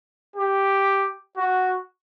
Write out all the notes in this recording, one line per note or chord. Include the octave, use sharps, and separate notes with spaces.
G4
F#4